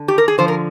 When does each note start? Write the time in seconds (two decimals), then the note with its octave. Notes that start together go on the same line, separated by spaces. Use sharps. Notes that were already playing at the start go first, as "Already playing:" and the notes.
Already playing: D3
0.08 G4
0.18 A#4
0.28 G#4
0.38 D3 F3 C5
0.48 A#4